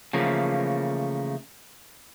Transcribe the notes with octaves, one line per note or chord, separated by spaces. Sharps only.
C#3 E3 F3 A3 A#3